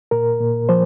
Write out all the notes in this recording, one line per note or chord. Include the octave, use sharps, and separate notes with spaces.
A#2 A#4
A#2
F3 C5